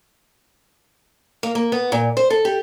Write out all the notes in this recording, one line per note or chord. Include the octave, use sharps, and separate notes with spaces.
A#3
A#3
B3
A#2
C5
A4
G4